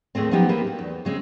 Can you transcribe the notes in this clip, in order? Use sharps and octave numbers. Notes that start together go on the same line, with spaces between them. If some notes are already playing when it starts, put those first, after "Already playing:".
D#2 A2 G#3 A3 C4
F3 F#3 A3 B3 D#4 G4
E3 A#3 B3 G4 B4
C4
E2
C#3 G#3 C4